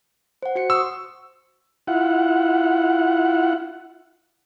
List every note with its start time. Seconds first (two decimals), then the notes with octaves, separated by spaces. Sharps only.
0.43 C5 F#5
0.55 F#4 F#5 C#7
0.70 C6 C#6 D#6 E6
1.87 E4 F4 F#5